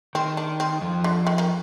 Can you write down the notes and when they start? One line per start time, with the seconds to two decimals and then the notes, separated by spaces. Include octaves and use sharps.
0.15 D#3 C4
0.37 D4
0.60 C4
0.82 F2 F3
1.04 D3
1.27 D#3
1.38 D#3